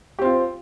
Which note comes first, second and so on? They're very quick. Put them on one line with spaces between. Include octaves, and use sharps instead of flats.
G4 C4 F4